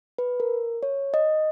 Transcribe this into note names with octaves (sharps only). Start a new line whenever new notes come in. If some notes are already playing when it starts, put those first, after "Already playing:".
B4
A#4
C#5
D#5